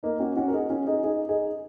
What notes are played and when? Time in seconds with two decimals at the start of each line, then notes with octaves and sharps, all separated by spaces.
0.03 A#3 D#4
0.20 C#4 F#4
0.36 C#4 F#4
0.48 A#4
0.53 D#4 G#4
0.70 C#4 F#4
0.87 D#4 G#4
1.03 D#4 G#4
1.29 D#4 G#4